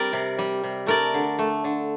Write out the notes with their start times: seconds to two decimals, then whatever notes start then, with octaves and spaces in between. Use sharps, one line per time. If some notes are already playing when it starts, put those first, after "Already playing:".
Already playing: G3 C4 A#4 D5
0.13 C3
0.39 G3
0.63 C3
0.86 A3 A#4 D5
1.14 D3
1.39 A3
1.64 D3